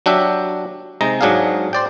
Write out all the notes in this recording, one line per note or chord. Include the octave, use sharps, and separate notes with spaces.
F#3 D4 G4 E5
C3 G#3 D#4 A#5
G#2 F#3 D4 G#4 F5
C5 D5 G5